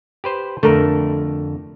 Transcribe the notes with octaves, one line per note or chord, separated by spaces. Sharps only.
G4 B4 C5
F2 D3 A3 A#4